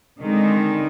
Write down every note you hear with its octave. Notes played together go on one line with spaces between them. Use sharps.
D3 D#3 G#3 C4 D#4